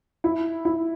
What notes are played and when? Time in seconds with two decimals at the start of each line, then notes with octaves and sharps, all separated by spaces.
0.24 E4
0.65 E4